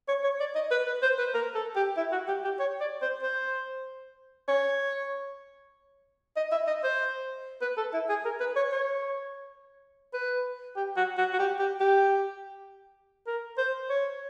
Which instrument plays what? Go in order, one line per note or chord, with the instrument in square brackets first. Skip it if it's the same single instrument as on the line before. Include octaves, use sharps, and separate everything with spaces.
[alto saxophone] C#5
C#5
D5
D#5
B4
B4
C5
B4
A#4
A4
G4
E4
F#4
G4
G4
C#5
D5
C5
C5
C#5
D#5
E5
D#5
C5
B4
A4
E4
G#4
A#4
B4
C#5
C#5
B4
G4
F#4
F#4
F#4
G4
G4
G4
A#4
C5
C#5